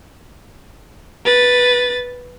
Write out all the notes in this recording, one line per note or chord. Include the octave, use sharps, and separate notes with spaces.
B4 A6